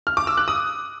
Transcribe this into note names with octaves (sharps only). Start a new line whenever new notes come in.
F6
D6
E6
F#6
D#6